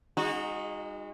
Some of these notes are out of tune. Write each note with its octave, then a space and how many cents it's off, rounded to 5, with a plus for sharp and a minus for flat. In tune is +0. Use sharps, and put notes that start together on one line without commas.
G#3 -40 D#4 +0 F#4 -25